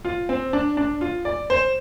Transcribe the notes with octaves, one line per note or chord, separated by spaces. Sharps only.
F4
C4
D4
D4
F4
D5
C5